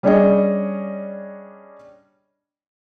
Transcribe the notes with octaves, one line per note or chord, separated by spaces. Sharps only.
G3 C#4 D4 G#4 C#5 D#5